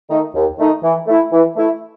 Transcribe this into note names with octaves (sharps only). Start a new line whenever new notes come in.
D#3 A3 D#4
D#2
D#3 A3 D#4
E3
A3 E4
E3
A3 E4